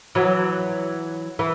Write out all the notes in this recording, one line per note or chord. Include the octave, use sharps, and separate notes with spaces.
E3 F#3
E3